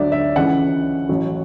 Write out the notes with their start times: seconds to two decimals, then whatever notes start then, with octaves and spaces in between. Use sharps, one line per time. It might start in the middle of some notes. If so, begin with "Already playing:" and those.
Already playing: D2 D3 F#3 D5 E5
0.12 E5
0.36 C#2 C#3 E3 F#5
1.09 A1 A2 F#3